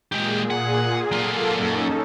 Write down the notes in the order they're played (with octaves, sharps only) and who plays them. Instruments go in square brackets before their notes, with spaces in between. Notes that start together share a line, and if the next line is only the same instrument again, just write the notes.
[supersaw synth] A#2 G#4 [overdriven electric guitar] G#3 G4
[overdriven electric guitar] F#5
[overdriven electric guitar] F#3 F4 [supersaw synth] A#3 A4
[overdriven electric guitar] F#2 [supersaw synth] C#4 D#4 A4